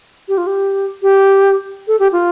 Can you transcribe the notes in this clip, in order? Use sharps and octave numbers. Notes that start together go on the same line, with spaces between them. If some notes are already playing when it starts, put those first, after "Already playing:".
G4
F4
G4
G4
A4
G4
F4